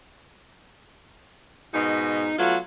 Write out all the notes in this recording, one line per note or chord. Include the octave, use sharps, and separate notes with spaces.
G#2 B2 D#4
F#3 A3 B3 F4